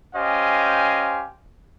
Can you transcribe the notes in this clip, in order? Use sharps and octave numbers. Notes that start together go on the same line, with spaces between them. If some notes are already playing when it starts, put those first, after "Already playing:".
C#4 G4 C5 D#5 F5 G#5